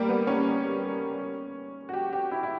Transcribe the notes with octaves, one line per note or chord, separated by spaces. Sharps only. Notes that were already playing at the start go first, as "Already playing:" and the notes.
Already playing: G3 A#3
B3
C#4
F#4
G4
G4
E4
E4